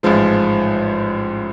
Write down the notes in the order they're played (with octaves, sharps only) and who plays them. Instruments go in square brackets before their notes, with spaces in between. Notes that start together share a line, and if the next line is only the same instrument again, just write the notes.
[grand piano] A1 G#2 F3 G#3